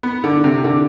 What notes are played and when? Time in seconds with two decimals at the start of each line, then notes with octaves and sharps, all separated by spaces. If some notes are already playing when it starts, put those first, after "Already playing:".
0.03 B3
0.24 D3
0.44 C3
0.64 D3